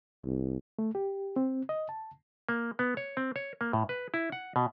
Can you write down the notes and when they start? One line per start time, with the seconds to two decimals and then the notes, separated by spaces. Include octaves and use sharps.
0.25 C2
0.79 A3
0.95 G4
1.36 C4
1.69 D#5
1.89 A5
2.49 A#3
2.79 B3
2.97 C#5
3.17 C4
3.36 C#5
3.61 A#3
3.73 A2
3.89 B4
4.14 E4
4.32 F#5
4.56 B2